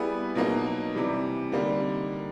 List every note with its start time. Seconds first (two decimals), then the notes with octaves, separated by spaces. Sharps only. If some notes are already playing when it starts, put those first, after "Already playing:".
Already playing: G3 B3 E4 G#4 B4
0.35 B2 F#3 A#3 D#4
0.94 C3 E3 G3
1.52 D3 G3 A#3 D#4